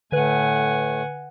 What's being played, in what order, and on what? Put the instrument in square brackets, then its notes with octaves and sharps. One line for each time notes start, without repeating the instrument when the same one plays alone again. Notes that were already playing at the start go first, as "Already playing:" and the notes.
[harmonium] A2 A3 [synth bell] D3 B4 [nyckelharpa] F#5 G#5